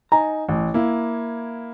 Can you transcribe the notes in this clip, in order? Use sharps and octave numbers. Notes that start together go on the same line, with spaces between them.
D#4 G#5 A#5
A1
A#3 E4